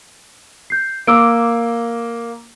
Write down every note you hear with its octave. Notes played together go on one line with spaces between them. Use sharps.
G6 C7
A#3 D6 E6 D7